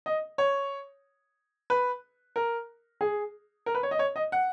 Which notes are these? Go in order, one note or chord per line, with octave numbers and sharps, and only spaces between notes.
D#5
C#5
B4
A#4
G#4
A#4
B4
C#5
D#5
C#5
D#5
F#5